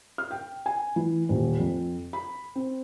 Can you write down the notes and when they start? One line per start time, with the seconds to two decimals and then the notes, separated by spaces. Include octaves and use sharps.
0.18 F6
0.31 G5
0.66 G#5
0.96 E3
1.29 D#1
1.59 F2
2.13 B5
2.55 C4